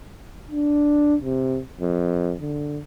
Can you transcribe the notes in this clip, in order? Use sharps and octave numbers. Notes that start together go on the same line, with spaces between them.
D4
C3
F2
D3